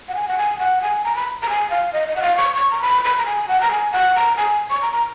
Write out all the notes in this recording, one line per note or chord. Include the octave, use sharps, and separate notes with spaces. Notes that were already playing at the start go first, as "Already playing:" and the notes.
F#5
G#5
F#5
G#5
F#5
G#5
A#5
B5
A#5
G#5
F5
D#5
D#5
F#5
F5
C#6
C#6
A#5
B5
B5
A#5
G#5
F#5
A#5
G#5
F#5
A#5
G#5
C#6
A#5
A#5